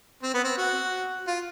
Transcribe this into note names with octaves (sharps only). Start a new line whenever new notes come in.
C4
B3
C4
F#4
F4